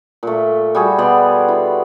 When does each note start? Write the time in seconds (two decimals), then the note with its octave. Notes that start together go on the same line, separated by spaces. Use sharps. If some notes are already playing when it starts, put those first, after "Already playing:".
0.23 A#2 A3
0.75 G3 F#4 G#4 A4
0.98 B2 B3 D5 C6
1.48 E4